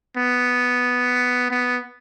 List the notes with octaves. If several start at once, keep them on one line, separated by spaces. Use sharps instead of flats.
B3
B3